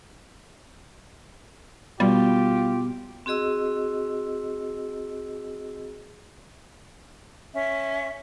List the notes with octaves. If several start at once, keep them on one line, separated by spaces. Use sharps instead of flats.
B2 G3 F4 G4
C4 F#4 G#4 D#5 E6
C#4 E5